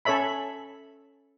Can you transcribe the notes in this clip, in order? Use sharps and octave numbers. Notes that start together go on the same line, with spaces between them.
C#4 A4 C#5 E5 B5